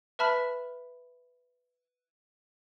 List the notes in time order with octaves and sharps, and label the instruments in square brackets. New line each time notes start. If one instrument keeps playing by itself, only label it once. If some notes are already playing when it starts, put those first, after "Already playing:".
[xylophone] B4 E5 A5 B5 F6 B6